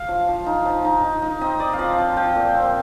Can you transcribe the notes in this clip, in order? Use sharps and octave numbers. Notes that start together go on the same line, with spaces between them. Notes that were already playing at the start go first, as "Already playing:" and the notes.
Already playing: F5
F3
F3
D#4
F3
D#4
D#4
D#4
C4 D#5
C4 D5
F5
F3 D#5
F3
F3 G5
A#2
C4